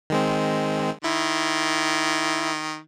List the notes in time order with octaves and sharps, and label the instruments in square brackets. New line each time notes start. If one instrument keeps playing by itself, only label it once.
[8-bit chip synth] D#3 G#3 C4
[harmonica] D#3 [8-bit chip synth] E4